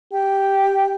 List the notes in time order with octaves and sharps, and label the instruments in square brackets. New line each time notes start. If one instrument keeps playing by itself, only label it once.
[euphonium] G4 [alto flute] G5